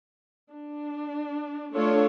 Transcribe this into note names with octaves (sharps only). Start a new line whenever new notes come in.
D4
A3 D4 F4 A4 C#5